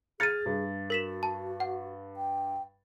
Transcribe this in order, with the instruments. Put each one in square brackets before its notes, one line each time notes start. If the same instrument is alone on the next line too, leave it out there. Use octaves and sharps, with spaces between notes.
[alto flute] G#4 [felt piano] F6 G#6 A6 [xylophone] C#7 D#7
[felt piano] G2
[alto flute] F#4 [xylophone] A#4 B6 E7
[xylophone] A5
F#5
[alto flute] G5